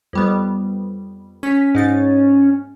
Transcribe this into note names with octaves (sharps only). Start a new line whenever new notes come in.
F2 G3 B3
C#4 B6
G#2 D#4 A6